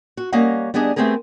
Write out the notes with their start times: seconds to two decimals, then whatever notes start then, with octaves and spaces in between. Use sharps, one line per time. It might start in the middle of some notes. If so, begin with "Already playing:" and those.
0.17 F#4
0.32 G3 A#3 C#4 D#5 F5 F#5
0.74 G3 B3 D4 G#4 D#5
0.96 A3 B3 C4 G4 G#4 A#4